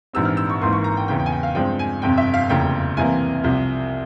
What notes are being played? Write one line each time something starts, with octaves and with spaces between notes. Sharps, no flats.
A#1 G#2 E3 G3 C4 E6
F6
E6
C#6
G#1 G#2 E3 A#3 C6
C#6
A#5
G5
E2 C#3 E3 G5
G5
G#5
G5
F5
G2 F3 G#3 C4 G5
G#5
G1 F2 C3 G5
E5
F5
F1 E2 C#3 F3 A#3 G5
C2 C3 E3 A#3 G#5
C2 C3 F3